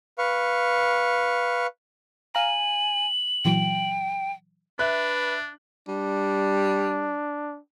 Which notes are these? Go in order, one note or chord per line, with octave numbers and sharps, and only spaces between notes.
B4 F5 C#6
F5 G#5 A#5 F#7
A#2 E3 F#3 G5
D4 B4 E5 F#6
G3 D4